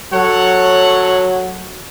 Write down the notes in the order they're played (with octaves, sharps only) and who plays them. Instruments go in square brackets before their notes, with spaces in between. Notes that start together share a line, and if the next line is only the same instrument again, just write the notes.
[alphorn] F#3 [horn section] A4 C#5 F#5